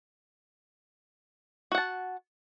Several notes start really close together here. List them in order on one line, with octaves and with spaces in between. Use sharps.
F#4 F#5 A5